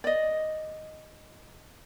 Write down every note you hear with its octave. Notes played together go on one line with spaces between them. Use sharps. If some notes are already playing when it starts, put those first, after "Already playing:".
D5 D#5